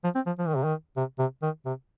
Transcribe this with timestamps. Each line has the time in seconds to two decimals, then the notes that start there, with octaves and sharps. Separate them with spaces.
0.04 F3
0.15 C4
0.26 F3
0.39 F3
0.48 D#3
0.56 C3
0.64 D#3
0.97 C3
1.19 C3
1.43 D#3
1.66 C3